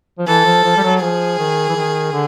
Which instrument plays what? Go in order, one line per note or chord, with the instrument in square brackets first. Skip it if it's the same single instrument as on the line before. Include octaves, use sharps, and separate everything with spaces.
[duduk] F3
[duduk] E3 [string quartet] A4
[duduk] F3
F3
G3
F#3
[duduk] F3 [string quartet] G#4
[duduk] D#3
E3
D#3
D3